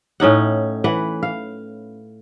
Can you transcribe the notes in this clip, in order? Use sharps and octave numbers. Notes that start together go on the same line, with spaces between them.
A2 C#4 D#4 F#5
E3 B4 F#5
F5